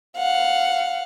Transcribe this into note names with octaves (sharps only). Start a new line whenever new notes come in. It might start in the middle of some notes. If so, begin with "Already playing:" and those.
F5 F#5